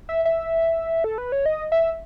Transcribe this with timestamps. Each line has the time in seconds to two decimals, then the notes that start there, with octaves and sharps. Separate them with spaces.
0.09 E5
0.25 E5
1.04 A4
1.18 B4
1.32 C#5
1.46 D#5
1.72 E5